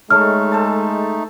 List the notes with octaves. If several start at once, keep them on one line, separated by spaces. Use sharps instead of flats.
G#3 A3 D#4 A4 C#5 E5 F6
A4 C5 A5